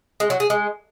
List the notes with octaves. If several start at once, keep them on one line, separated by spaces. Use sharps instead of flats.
G#3
F#3
G#4
G#3